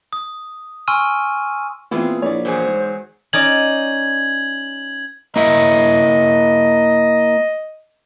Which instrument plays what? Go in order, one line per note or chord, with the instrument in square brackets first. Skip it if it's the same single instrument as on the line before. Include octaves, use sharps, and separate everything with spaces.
[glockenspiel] D#6
G#5 C6 C#6 E6 F6 D#7
[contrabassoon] A#2 [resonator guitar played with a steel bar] E3 F4 G#4 [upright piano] B3 C4 E4
[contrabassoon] A#1 [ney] E4 [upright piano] C#5 D5
[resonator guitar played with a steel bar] E2 F#3 G#4 [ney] C5
[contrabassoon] G#2
[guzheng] C#4 D#4 D5 [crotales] G#6 F#7
[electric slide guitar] A#3 E4 E5 [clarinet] D#5